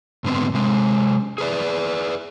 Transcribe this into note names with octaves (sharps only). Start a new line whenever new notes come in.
G#2 D3 B3 C4
C3 G#3
G#4 B4 D5